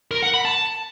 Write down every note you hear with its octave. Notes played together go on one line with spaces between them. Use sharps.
A#4
F#5
B5
A5